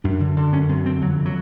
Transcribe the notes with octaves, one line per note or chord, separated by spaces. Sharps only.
F#2 D4
D3
D3
F#2 C#4
F#2 C4
D3 C4
F2 F#3
C3
F#3